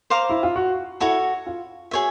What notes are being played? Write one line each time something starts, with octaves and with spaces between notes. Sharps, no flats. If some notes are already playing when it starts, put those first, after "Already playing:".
C5 F5 A#5 D6
E4
F4
F#4
E4 F#4 A4 C#5
F4
F#4 G#4 C#5 E5